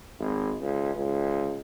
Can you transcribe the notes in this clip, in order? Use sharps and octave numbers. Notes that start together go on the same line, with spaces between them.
G#1
C#2
C#2